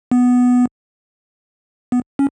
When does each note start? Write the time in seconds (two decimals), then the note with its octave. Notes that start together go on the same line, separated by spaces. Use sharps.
0.12 B3
1.92 B3
2.19 C#4